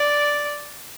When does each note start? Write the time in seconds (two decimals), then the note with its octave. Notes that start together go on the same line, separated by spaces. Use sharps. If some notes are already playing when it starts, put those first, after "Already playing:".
Already playing: D5